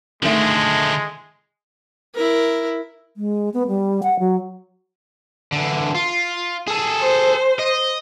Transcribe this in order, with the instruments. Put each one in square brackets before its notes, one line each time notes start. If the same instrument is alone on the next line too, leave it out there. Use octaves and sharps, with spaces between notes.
[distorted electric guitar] D3 F3 [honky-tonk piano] D#3 A3 [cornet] G#3
[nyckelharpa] E4 A#4
[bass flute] G#3
B3
G3
F#5
F#3
[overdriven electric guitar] D3 E3
F4
G#4 A4
[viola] C5
[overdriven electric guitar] D#5